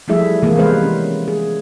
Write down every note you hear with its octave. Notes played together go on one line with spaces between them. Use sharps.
F3 G3 A3 E4 G#4 E5
C3 E3 G3 G#3 A#3 G#4
G3 G#3 B3 B4 C5 F5
C#4
G#4